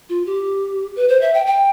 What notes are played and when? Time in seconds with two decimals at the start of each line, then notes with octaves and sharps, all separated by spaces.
0.09 F4
0.26 G4
0.96 B4
1.09 C5
1.21 E5
1.34 G5
1.46 G5